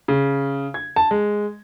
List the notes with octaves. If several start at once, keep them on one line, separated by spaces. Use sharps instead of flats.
C#3
G#6
A5
G#3